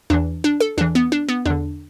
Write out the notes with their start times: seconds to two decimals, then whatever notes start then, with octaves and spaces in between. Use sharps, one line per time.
0.10 E2 E3 D4
0.44 D4
0.60 A4
0.78 E2 E3 D4
0.95 B3
1.12 D4
1.29 B3
1.46 E2 D3 D4